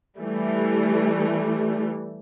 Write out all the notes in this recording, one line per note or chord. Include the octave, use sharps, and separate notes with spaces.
E3 G3 A3